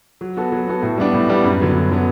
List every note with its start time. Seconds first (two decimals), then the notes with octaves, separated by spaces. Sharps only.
0.21 F#3
0.37 B3 F#4 A4
0.52 F#3
0.68 B3 F#4 A4
0.83 A2
0.98 G3 B3 D4
1.14 A2
1.29 G3 B3 D4
1.44 F#2
1.60 D3 F#3 B3
1.76 F#2
1.91 D3 F#3 B3